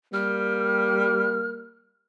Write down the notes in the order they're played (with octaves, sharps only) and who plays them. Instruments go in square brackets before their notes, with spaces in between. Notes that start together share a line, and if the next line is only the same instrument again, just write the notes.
[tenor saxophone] G3 [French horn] A#3 [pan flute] F6